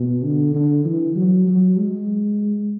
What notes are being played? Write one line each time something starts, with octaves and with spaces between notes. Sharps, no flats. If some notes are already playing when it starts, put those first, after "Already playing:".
Already playing: B2
D3
D3
E3
F#3
F#3
G#3